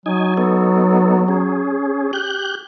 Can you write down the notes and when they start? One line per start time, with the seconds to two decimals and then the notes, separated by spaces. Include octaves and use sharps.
0.06 F#3 D#4 G#5
0.37 B3 D#4 A4
1.28 C#4 G#4
2.13 G4 F#6 G6